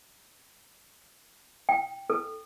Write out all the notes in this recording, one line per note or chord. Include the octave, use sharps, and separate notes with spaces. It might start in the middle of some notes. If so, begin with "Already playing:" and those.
G5
A4